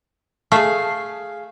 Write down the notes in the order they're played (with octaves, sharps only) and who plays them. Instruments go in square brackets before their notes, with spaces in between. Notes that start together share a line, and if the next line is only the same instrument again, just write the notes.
[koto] A3 E5 [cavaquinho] G#4 F5